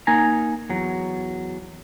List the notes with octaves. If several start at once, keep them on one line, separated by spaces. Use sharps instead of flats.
A#3 D#4 G#5 A#5
E2 F#3